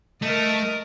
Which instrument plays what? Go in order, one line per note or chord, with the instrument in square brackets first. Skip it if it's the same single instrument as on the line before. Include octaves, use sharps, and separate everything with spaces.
[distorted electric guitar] A3 [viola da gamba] A#4 D#5